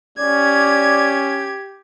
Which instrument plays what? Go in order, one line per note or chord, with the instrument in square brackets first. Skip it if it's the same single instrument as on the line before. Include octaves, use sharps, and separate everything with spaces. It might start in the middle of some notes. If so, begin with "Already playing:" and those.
[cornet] C#4 [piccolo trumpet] G4 [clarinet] D5 [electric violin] G#6